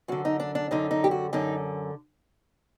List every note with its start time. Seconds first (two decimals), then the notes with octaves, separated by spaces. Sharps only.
0.08 F#2 D3 F#4
0.25 D#4
0.40 D4
0.55 D4
0.71 F#2 D3 D#4
0.91 D#4
1.04 G4
1.11 F#4
1.33 F#2 D3 D#4